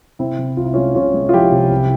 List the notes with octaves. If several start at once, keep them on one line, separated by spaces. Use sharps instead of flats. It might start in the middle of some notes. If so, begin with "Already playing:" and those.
C3 C4 E4
C3
C2 F4
E4
G#3 C#4 F4
C3 C#4 F4
G#3
F4
F3 E4 G4
C3
C2